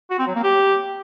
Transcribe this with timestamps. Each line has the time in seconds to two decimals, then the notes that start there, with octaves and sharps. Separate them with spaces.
0.10 F#4
0.19 C4
0.27 F#3
0.35 A#3
0.44 G4